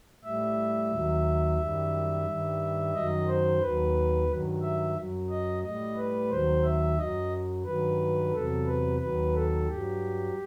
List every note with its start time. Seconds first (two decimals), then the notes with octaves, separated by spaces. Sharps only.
0.24 A2 G3 E5
0.91 D#2 D#3 F#3
1.60 F#2 D#3 G3
2.26 G2 D#3 G3
2.94 F#2 D#3 F#3 D#5
3.27 C5
3.61 D#2 D#3 F#3 B4
4.28 G2 D#3 F#3
4.62 E5
4.96 F#2 F#3
5.29 D#5
5.63 A2 G3 D#5
5.97 B4
6.30 D#2 D#3 F#3 C5
6.64 E5
6.98 F#2 F#3 D#5
7.65 G2 D#3 F#3 B4
8.32 E2 C3 F#3 A4
8.66 B4
9.00 D#2 D#3 F#3 B4
9.33 A4
9.67 G2 F#3 G4